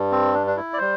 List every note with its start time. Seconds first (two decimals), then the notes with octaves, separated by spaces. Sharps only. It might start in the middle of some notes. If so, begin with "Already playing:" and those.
Already playing: G2 G3
0.12 C4
0.34 D4
0.47 D4
0.56 E4
0.73 D5
0.78 G3 C5